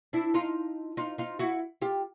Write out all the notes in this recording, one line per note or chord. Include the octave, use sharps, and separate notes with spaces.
D4 E4
D#4 F4
D#4 F4
D#4 F4
E4 F#4
F4 G4